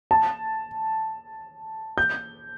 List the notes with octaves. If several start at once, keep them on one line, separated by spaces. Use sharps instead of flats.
A5
G6